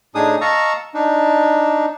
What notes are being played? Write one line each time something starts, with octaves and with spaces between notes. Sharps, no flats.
A2 D4 D#4 G#4 D#6
D#5 F5 A5 A#5 C#6 E6
D4 D#4